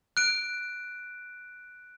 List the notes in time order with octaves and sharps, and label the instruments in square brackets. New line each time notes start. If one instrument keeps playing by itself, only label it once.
[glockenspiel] F#6 D7